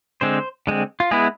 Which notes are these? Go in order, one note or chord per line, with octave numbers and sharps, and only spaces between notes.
D3 G#3 C4 C5
D3 G#3 C4
F4
G#3 B3 E4 G#4